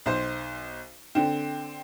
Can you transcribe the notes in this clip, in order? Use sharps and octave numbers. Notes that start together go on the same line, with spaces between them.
B1 C5
D3 C4